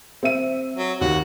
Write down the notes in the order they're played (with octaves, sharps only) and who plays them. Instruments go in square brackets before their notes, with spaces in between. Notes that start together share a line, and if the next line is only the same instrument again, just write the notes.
[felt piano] C4 E5 D#7
[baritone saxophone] F#3
[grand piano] D#2 [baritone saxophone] F#4